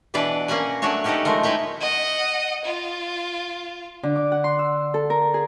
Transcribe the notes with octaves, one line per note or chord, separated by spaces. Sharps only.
B2 E3 D4 B4 D5 F#5
A#3 C#4 A#4 F#5 G#5
F#3 A3 D4 F#4 C#5
C#4 D#4 G4 A4 B4 D#5
F3 G#3 A3 A#4
D#4 E4 B4 C#5 G5
D#5 F#5
F4
D3
D6
F#5
C6
E6
A4
A#4
G#4